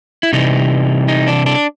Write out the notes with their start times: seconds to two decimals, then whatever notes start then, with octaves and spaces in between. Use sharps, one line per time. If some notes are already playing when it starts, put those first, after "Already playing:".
0.23 E4
0.33 C3 E3 G3 D#4
1.08 D#4
1.27 D4
1.46 D4